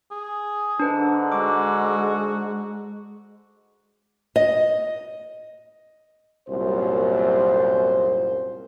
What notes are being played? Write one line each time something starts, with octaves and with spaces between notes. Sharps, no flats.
G#4
G#2 D3 D4 B4
G#3 F#4 D6
D#5
C2 F#2 A#2 C5